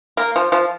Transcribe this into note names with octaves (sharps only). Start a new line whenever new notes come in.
A#3
F3
F3